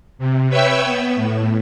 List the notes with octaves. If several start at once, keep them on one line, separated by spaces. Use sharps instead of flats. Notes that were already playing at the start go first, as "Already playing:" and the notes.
C3
B4 C#5 E5 G5 E6
B3
A2